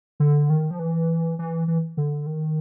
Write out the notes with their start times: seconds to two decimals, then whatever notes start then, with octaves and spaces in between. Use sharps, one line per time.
0.20 D3
0.50 D#3
0.71 F3
0.79 E3
1.39 E3
1.68 E3
1.97 D3
2.26 D#3